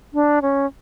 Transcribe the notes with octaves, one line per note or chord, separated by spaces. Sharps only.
D4
C#4